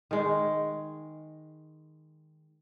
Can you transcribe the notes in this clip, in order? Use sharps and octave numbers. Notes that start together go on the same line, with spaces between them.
D#3 G#3